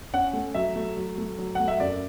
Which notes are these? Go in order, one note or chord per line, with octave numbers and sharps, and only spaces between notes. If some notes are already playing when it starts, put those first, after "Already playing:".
C#4 F#5
A3
F#3 E5
A3
F#3
A3
F#3
A3 F#5
E5
F#2 D5